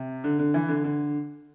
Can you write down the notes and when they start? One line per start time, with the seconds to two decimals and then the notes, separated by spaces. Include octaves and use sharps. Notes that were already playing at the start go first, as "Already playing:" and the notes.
Already playing: C3
0.24 D3
0.39 D3
0.54 E3
0.68 D3
0.84 D3